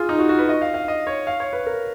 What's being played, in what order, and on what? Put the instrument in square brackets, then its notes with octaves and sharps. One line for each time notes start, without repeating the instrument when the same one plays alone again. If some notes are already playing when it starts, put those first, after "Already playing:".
Already playing: [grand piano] F4 G#4
D#4
F#4
F#4
B4
D#5
F5
F5
D#5
C#5
F5
C#5
B4
A#4